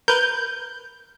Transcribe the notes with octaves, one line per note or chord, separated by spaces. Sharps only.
A#4 B4 G6